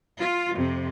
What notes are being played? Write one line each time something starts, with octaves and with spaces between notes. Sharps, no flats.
F4
F2 C3